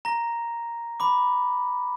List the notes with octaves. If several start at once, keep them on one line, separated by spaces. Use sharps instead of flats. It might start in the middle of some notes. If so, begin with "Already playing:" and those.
A#5 A#6
B5 D6